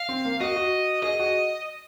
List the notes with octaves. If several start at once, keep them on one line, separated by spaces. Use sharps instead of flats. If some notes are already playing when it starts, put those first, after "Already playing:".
Already playing: F5
C4
A#3
F#4 D#5
F#4
G#4 D#5
F#4